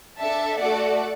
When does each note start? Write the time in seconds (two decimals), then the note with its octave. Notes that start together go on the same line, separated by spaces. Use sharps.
0.17 D4 A4 E5 A5
0.58 A3 F#4 A4 D5 F#5